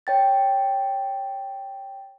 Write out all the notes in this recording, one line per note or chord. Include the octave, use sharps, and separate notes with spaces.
C#5 G5 A6